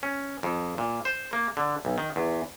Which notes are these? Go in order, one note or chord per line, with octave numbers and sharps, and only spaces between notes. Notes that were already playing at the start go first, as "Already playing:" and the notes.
C#4
F2
A#2
C5
A#3
D3
B1
D#3
E2